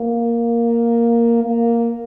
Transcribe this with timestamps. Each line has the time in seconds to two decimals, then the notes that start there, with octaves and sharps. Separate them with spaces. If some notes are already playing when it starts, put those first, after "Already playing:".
Already playing: A#3
1.43 A#3